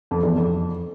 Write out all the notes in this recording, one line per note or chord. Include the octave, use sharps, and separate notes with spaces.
F2
E2
F2